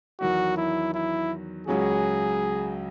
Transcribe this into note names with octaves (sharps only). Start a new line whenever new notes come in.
E2 D#3 F#3 F#4
E4
E4
C#2 C#3 F#3 C#4 F#4 G#4